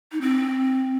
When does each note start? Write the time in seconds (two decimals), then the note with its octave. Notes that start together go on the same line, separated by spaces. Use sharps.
0.12 D#4
0.21 C4